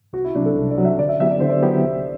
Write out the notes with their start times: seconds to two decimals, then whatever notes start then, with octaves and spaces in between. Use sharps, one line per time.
0.13 C2 F#4
0.24 E4
0.35 C3 F#3 D4
0.46 A4
0.56 C2
0.71 D5
0.78 C3 F#3
0.85 E5
0.99 D3 D5
1.09 E5
1.20 F#3 B3 E4 G4 E5
1.31 D5
1.40 D3 C5
1.50 D5
1.63 F#3 B3 E4 G4
1.84 C2